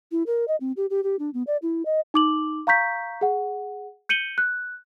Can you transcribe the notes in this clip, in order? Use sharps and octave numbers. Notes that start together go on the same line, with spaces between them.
E4
A#4
D#5
C4
G4
G4
G4
D4
B3
D5
E4
D#5
D#4 D6 F#7
F5 A#5 C#6 G6 B6
G#4 F#5
G6 C#7 D#7 F#7 G7
F#6